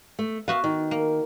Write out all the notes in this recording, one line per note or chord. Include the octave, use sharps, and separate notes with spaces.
A3
B3 F#4 E5 F5
D#3
A#3